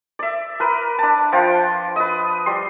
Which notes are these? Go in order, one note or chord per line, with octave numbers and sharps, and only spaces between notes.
D5 E5
A#4 B4
D4 A5
F3 F4 G5
B4 D#5
G3 C6